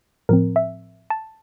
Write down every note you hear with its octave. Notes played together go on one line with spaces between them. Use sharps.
A2 F3 C4 A#4
E5
A5